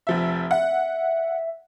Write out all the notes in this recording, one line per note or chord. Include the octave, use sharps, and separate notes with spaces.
F1 F3 E5
E5 F#5